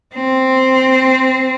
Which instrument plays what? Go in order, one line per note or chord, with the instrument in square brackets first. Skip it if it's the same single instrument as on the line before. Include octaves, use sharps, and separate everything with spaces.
[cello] C4